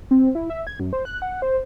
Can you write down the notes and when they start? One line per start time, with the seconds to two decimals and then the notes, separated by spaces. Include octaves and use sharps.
0.11 C4
0.35 E4
0.50 E5
0.67 G#6
0.80 F#2
0.93 C5
1.05 F#6
1.22 F#5
1.42 C5